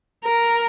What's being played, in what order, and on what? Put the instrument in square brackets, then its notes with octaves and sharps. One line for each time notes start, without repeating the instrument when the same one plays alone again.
[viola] A#4